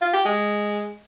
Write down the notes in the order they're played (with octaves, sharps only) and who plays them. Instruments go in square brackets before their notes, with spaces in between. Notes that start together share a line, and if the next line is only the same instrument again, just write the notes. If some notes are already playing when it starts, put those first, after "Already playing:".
[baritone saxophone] F4
G4
G#3